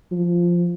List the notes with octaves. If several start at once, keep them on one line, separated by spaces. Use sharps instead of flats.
F3